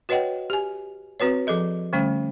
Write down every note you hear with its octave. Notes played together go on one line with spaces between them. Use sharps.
F#4 B4 C#5 D#5 F#5 G5
G4 G#5
C4 F#4 B4 C#5
F3 G#4 A4 D#5
D3 G3 A3 C#4